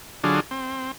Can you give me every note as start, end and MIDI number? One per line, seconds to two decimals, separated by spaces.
0.24 0.40 50
0.24 0.40 54
0.24 0.40 62
0.24 0.40 65
0.24 0.40 68
0.51 0.91 60